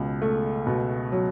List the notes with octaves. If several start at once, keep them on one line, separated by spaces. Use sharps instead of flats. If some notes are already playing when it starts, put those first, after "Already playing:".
Already playing: C#2 B2
A3
B2
F#3